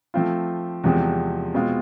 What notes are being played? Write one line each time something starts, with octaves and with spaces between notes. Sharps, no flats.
F3 A3 C4 F4
E2 C3 F3 G#3 C4
B2 G#3 C4 F4